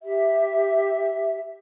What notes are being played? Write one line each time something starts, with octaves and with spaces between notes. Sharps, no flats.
G4 E5